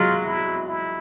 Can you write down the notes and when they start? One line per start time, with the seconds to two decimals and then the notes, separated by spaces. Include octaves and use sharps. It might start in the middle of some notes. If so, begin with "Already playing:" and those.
Already playing: F#3 G#3 F4
0.25 E4
0.68 E4